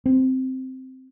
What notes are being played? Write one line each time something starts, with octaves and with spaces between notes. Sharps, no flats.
C4